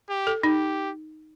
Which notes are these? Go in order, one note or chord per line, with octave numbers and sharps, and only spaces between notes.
G4
A4
D#4 G4